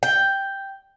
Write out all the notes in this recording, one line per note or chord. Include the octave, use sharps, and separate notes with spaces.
G5